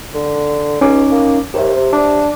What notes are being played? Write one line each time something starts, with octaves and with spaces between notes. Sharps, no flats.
D3
C#2 C#4 D#4 D6
A#3
D#2 G4 C5 E5
C3
D4